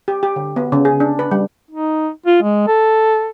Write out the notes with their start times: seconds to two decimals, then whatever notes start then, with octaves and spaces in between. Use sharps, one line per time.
0.08 G4
0.23 G4
0.36 D3
0.56 B3
0.72 C#3
0.85 G#4
1.00 D4
1.19 B4
1.31 G3
1.71 D#4
2.26 F4
2.42 G#3
2.67 A4